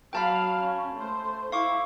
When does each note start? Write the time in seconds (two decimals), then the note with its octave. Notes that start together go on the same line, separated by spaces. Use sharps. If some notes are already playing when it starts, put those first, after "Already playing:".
0.13 F#3 F5 G5 A5 B5
0.61 C#4
0.95 A3 C5
1.52 E4 F5 C#6 D6